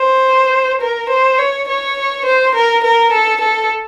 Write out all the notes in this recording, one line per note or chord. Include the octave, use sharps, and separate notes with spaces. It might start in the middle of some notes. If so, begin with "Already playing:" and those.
Already playing: C5
A#4
C5
C#5
C#5
C5
A#4
A#4
A4
A4